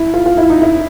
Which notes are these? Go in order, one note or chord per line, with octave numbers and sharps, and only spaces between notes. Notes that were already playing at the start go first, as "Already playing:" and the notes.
Already playing: E4
F4
F4
E4
D#4
E4